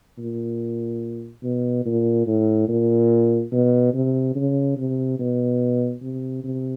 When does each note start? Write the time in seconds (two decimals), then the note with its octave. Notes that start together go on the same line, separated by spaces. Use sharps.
0.18 A#2
1.43 B2
1.85 A#2
2.27 A2
2.68 A#2
3.52 B2
3.94 C3
4.35 C#3
4.77 C3
5.19 B2
6.02 C3
6.44 C3